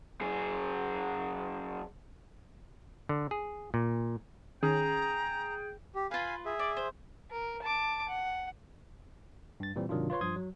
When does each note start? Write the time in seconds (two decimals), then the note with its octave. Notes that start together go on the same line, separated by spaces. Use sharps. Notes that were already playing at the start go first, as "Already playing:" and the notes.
0.21 F#2 G#4
3.09 D3
3.31 G#4
3.74 A#2
4.63 D#3 C#4 G#4 G5 A#5
5.95 G4
6.11 F4 B4 F5 G#5 B5
6.46 G#4 E5
6.59 D5
6.77 C5
7.31 A#4
7.62 A5 D6
8.09 F#5
9.60 G2 A6
9.76 A#2 E3 G3 C4
9.89 G#2 C3 D#3 F#3 D4 F4
10.10 F4 B4 C#5 C6
10.21 G2 F3 C6 D#6 G#6
10.36 F#3